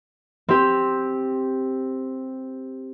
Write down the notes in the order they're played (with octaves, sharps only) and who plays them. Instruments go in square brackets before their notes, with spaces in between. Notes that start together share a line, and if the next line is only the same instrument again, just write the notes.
[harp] C4 G4